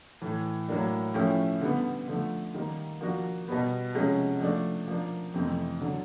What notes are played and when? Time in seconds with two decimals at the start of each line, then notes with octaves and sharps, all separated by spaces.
0.22 A2 E3 A3
0.69 A2 F#3 A#3 D4
1.14 F3 A3 C#4 E4 G4
1.61 D3 G3 B3
2.08 D3 F3 A3
2.55 D#3 G3 A#3
3.01 F3 A#3 D4 F#4
3.48 B2 G3 B3
3.94 C3 F3 G#3 C#4
4.40 F3 A3 D4
4.87 F3 A#3 D4
5.34 F2 C3 E3 A3 C4
5.81 D3 F#3